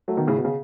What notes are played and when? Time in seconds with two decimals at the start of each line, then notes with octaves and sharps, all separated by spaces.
0.08 F#3 A3
0.17 B2 D#3
0.27 A2 C#3
0.38 B2
0.45 C#3